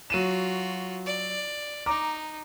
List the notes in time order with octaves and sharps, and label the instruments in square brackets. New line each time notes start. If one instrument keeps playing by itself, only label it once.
[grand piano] F#3 D#7 E7 [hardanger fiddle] F4 F#4
[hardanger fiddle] D5
[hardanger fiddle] D#4 [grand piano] A#5 D6